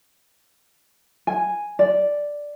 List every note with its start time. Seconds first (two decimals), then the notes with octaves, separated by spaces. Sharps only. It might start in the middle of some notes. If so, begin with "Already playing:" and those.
1.27 G#5
1.79 D5